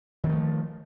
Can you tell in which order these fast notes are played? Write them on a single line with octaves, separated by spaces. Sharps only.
D#3 B3 A3 F3